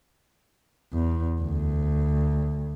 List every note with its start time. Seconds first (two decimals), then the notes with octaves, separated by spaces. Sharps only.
0.93 E2
1.42 D2